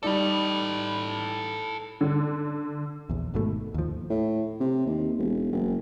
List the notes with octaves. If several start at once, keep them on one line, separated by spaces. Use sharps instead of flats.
G3 D#4 A4 B4 D5
D3
A#1 E2
G#1 G#2 B2 A3
D#2 F3
A2
C3
D#2
E1
F#1